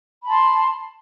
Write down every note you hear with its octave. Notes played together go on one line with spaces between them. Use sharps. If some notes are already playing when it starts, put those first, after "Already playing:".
A5 B5 C6